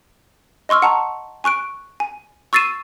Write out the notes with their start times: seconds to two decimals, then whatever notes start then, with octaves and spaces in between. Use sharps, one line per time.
0.69 D#5 C6 C#6 E6 F6
0.82 F#5 A5 A#5 C#6
1.44 G#5 C#6 F#6 D7
2.00 G#5
2.53 C#6 E6 A6 C7 D#7 E7